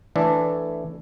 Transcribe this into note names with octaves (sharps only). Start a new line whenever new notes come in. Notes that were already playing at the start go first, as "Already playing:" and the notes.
E3 A3 D4 A4